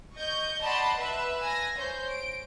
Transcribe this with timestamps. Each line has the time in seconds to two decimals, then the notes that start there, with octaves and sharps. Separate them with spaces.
0.16 D#5 C#6 G6
0.61 D5 D#5 F#5 A5 B5 C6
0.97 B4 E5 E6 F#6
1.42 G#5 A#6
1.77 C5 C#5 G6
2.10 D7